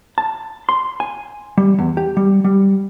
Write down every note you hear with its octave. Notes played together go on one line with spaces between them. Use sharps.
A5
C6
G#5
G3
E2
G4
G3
G3